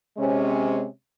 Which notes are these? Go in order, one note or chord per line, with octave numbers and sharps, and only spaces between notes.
C3 G#3 C4 C#4